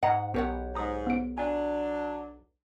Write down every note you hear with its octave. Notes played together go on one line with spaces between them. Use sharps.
G#2 D#5 F#5 A#5
B1 B3 G4 A#4 C#5 F#5
G#2 A#5 D#6
B3 D7
F#3 D4 G#5